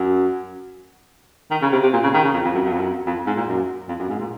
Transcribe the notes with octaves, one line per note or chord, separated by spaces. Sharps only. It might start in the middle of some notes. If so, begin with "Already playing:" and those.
Already playing: F#2
D#3
C#3
C3
C3
A#2
C#3
D#3
C#3
F2
F2
F#2
F#2
F2
F#2
F2
G#2
A#2
F#2
F2
F#2
G#2
A#2